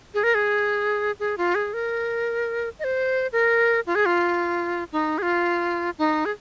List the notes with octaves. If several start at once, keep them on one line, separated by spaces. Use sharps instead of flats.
G#4
A#4
G#4
G#4
F4
G#4
A#4
D#5
C5
A#4
F4
G#4
F4
D#4
G#4
F4
D#4
G#4